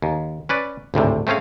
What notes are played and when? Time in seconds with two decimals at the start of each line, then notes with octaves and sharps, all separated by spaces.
0.02 D#2
0.49 C#4 B4 D5
0.94 G#1 D2 A2 C3
1.27 A3 C4 C#4 G#4 F5